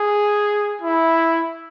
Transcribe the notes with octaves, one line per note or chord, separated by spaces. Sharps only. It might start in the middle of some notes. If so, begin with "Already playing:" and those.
Already playing: G#4
E4